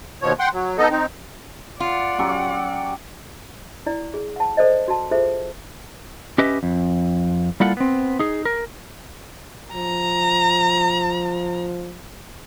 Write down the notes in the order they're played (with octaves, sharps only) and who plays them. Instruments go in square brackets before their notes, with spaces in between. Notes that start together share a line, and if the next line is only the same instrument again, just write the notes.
[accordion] D#2 B2 F3 C#5
F#5 G5 C6
F#3
B3 D#4 A4 D#5
C4 D#4
[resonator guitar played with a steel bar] F4 [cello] D5 F#5
[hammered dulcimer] F#3 C#4 G4
[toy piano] E4 D5
G#4
F#5 A5
A4 C5 D5 D#5
F#4 A5
F4 G#4 A4 C5 E5
[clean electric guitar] C#4 G4 B4 D#5 E5
F2
G3 A#3 E4 F4 A4 F#5
B3 C4
D#4 G#4
A#4
[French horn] F3 [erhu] A#5